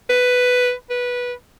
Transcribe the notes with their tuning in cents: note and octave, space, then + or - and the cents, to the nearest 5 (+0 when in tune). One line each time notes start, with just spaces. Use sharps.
B4 +5
B4 -15